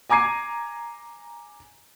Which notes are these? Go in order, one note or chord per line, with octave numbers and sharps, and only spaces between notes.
G#5 A#5 D6 G#6 C7 D#7